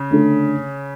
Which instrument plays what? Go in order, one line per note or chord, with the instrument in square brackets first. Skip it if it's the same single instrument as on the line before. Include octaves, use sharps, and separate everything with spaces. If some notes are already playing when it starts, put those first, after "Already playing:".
Already playing: [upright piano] C#3
[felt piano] D3 A3 D4 A4